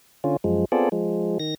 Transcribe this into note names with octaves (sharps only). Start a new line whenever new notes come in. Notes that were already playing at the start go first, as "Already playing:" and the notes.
D3 C#4 F4
F#2 F3 G#3
B3 C4 F4 G#4 A4 D5
F3 G#3
D#3 A#6